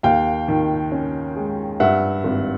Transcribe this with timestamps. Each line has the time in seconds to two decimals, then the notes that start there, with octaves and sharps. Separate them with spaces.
0.03 D#2 F5 G5
0.48 D#3
0.92 C#4
1.36 G#3
1.80 G2 E5 F#5
2.24 G#1